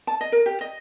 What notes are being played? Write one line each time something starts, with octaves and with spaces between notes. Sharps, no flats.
A5
D#5
A#4
G4
D#5